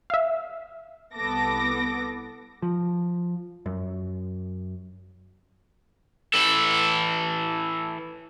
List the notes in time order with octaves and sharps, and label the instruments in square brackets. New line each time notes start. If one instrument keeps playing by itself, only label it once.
[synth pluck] E5 F5
[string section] C2 B3 A4 D6 A#6
[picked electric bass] F3
F#2
[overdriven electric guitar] E3 A4